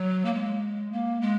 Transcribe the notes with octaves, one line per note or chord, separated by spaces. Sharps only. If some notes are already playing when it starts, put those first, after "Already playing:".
Already playing: F#3
A#3
G#3
A#3
G#3